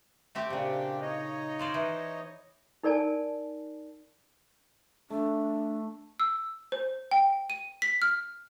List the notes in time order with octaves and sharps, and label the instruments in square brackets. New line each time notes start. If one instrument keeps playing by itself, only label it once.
[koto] A3 C4 G4
[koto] A#2 C#3 [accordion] C4 D4 G4
[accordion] D#4 C#5 D#5
[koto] F4 C5 D5
E3
[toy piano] D#4 A#4 D5 G#5 A5
[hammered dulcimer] A3 [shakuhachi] D4
[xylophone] E6
C5
G5
D#7
B6
F6